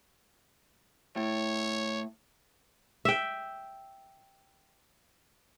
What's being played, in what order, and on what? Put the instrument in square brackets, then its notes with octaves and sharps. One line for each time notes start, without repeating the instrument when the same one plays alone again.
[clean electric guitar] A2 [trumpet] C#5
[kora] E5 G5